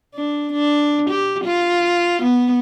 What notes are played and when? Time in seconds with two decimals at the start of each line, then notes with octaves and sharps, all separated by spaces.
0.15 D4
0.52 D4
1.10 G4
1.44 F4
2.23 B3